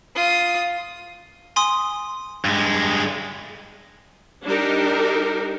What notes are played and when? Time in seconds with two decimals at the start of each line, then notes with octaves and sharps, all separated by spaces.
0.15 F4 D#6
1.56 G#5 C6 D#6
2.45 G2 G#3
4.45 G3 D4 D#4 G4 A#4